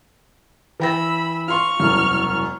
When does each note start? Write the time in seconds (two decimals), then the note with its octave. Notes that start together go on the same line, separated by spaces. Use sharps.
0.80 E3 G5 B5 E6 A#6
1.48 F4 C6 C#6 F6
1.80 E1 C2 F#2